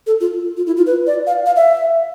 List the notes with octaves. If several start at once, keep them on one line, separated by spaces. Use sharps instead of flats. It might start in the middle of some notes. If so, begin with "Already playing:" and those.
A4
F4
F4
E4
F4
B4
D5
F5
F5
E5